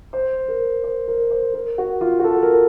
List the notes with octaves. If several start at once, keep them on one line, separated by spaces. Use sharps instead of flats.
C5
A#4
C5
A#4
C5
A#4
F#4
F4
F#4
A4
A#4